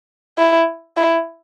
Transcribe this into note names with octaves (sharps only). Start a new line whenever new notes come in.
E4
E4